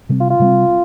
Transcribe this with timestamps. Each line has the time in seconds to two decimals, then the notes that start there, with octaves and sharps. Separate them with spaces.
0.09 C3 G3 C4
0.20 F4
0.30 F4
0.39 C3 G3 C4